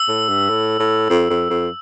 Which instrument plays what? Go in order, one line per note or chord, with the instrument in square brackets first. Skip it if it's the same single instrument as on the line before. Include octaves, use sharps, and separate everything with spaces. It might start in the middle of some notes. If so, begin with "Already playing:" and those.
Already playing: [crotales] E6
[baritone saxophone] A2
G2
A2
A2
F2
F2
F2